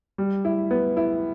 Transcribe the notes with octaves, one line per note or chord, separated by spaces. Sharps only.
G3
E4
B3
E4